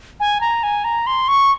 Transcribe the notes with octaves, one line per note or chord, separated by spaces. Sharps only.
G#5
A#5
G#5
A#5
C6
C#6